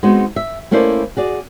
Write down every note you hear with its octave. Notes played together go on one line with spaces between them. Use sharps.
G#3 B3 C4 D#4 F#4
E5
A3 A#3 C#4 E4 C5 D5
F#4 G#4 D5